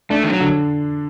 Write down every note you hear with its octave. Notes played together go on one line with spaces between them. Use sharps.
A3 D4
D#3
F#3
D3